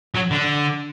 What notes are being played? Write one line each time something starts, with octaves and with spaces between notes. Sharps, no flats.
F#3
D3